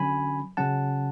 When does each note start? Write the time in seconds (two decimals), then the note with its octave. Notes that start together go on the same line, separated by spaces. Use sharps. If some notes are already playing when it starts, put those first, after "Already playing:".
Already playing: D3 F#3 C#4 G#5 B5
0.57 C#3 F#3 C#4 F#5 A5